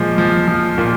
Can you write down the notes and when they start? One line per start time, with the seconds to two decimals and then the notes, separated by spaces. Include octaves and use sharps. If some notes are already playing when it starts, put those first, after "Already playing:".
Already playing: A#2 F3 G#3
0.18 F3
0.48 F3
0.78 A#2